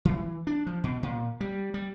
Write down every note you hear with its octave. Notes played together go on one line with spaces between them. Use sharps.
E3
D4
F3
B2
A#2
G3
G3